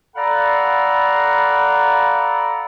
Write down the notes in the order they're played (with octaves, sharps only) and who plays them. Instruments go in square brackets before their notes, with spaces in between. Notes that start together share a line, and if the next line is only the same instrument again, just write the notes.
[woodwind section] A4 D5 F5 F#5 A#5 B5